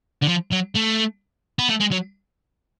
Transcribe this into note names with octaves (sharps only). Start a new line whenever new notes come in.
D3
F3
F#3
A3
B3
A3
G#3
F#3